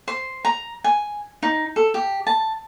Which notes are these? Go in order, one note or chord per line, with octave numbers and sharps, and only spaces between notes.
C5
A#5
G#5
D#4
A4
G4
A5